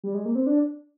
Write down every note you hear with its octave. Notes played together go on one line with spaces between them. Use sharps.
G3
G#3
A#3
C4
D4